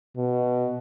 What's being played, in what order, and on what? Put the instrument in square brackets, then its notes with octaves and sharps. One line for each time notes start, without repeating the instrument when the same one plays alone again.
[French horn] B2